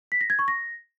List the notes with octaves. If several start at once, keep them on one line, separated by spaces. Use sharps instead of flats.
B6
A#6
G#6
C#6
A#6